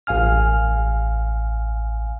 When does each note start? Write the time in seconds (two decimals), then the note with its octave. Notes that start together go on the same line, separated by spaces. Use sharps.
0.07 A1 F5 G#5 F6